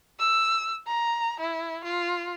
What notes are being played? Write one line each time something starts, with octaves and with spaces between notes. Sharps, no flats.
E6
A#5
E4
F4